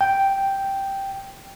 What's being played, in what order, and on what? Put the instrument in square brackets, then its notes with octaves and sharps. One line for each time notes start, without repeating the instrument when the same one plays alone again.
[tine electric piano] G5